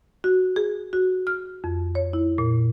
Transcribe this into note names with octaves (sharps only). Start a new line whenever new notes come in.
F#4
G#4
F#4
F6
F2
C#5
E4
A#2